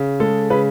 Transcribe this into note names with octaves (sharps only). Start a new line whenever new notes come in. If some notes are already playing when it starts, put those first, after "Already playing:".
Already playing: C#3
G#3 A4
C#3 B4